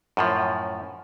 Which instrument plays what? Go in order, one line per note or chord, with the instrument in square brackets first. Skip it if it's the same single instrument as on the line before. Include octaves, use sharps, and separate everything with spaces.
[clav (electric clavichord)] F#2 A2 F3